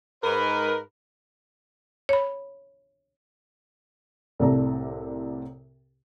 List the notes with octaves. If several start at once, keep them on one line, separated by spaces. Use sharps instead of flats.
G#2 A#4 B4
C#5 B5
C2 A2 C3 A4 D5 A#5